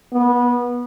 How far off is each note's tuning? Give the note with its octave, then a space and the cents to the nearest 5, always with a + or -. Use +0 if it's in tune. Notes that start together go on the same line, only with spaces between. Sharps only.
B3 -20